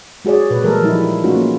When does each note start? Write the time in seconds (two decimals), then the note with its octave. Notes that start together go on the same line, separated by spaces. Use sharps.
0.25 G#3 F#4 G#4 C#5 D5
0.50 A#2 B4
0.64 E3 G3 G#3 A4 A#4
0.82 F3 G3 G#3 D#4 E4
1.24 A3 C#4 D#4 F4 F#4
1.35 A#3